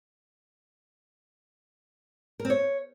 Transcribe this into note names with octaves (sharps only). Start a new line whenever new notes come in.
A#4
C4
C#5